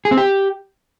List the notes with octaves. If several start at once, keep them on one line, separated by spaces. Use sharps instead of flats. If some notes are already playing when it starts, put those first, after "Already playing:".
G#4
C4
G4